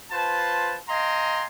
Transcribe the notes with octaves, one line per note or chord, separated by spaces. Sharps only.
F4 B4 C5 A5
D#5 F5 G5 G#5 A#5 C6